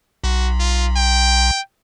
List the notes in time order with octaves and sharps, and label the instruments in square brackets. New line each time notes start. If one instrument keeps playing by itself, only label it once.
[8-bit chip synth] B1 [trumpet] F#4
[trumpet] F4
G5